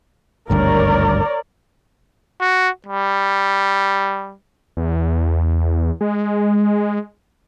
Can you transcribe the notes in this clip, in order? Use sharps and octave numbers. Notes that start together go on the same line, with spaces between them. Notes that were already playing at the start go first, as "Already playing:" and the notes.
G#1 D2 G2 A#4 C#5 D5
F#4
G3
E2
G#3